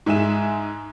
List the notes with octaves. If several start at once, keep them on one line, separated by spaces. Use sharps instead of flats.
G#2 G#3 E5 G#5 E7